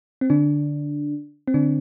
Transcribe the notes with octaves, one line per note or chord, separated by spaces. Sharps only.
C4
D3 D4
C4
D3 D4